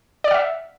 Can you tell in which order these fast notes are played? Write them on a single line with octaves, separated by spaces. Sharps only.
D5 F6 F#5 E5